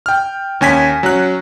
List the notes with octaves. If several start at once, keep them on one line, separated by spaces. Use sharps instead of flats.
G5 F6
D#2 C#4 G#5 B6
F#3 C#4 F#6